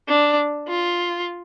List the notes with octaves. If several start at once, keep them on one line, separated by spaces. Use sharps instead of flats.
D4
F4